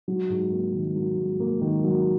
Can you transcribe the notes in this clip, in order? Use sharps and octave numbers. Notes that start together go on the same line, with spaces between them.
F#3
G#2
A#3
D#3
F#3
G#2
A#3
D#3
F#3